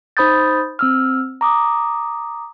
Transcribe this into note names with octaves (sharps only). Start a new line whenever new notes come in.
D#4 C5 B5 D#6 G6 A6
C4 E6 F6
A#5 D6 D#6